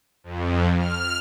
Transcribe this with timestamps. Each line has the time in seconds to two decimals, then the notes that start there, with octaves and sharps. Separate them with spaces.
0.24 F2
0.78 F6